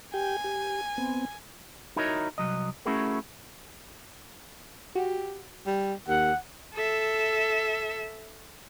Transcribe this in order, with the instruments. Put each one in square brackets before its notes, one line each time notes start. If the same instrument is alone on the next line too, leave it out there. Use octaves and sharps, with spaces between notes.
[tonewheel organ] G4 G5 [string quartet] G#5
[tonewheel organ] G4
B3 C4
[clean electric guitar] D#4 E4 F#4 A#4 C#5 D#5
C2 F#3 D#5
A3 C#4 E4 F#4 G#4 A#4
[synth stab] F#4 [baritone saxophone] G4
[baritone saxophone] G3
[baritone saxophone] D#2 [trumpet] F#5
[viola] A4 E5